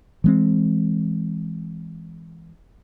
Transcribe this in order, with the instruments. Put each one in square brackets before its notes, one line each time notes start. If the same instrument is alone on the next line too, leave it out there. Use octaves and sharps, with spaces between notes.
[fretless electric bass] E3 G#3 C4